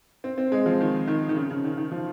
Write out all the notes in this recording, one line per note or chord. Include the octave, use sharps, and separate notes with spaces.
C4
C4
G#3
F3
D#3
D#3
D#3
C#3
C#3
D#3
D#3
F3